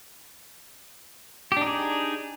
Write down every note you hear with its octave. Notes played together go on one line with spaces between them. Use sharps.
D4 D#4 G4 G#4